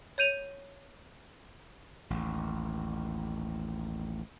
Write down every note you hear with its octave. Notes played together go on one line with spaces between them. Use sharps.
C#5 G6 D#7 F7
A1 D#2